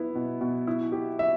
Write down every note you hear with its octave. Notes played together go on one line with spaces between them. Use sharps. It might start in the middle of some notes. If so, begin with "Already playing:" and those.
Already playing: B3 E4
B2
B2
E4
G4
E5